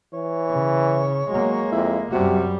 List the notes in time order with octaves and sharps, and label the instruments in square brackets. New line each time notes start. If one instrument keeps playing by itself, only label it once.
[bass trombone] E3 [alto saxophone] C#5
[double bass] C#3
[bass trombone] F#3 [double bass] G#3 A#3
[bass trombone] F2 [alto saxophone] E4
[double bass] F#2 G3 [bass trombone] C3 [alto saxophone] F#4